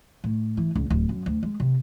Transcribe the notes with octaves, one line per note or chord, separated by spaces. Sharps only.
A2
E3
C#2
D1
F#2
D2
G#3
C3